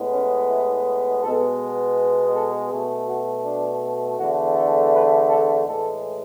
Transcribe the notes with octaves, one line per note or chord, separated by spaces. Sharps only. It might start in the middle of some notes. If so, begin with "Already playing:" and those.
Already playing: A2 G#3 B3
C#4
E4
B2 G#3 B3 A4
A4
B2 A3 G#4
F#4
D4
E2 D3 A3 F#4
A4
B4
A4
A2 E3 G#3 A4